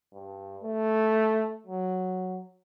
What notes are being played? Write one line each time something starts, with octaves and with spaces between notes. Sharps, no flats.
G2
A3
F#3